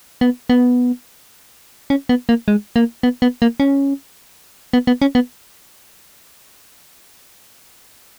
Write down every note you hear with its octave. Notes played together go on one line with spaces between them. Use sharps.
B3
B3
C#4
B3
A#3
G#3
A#3
B3
B3
A#3
C#4
B3
B3
C#4
B3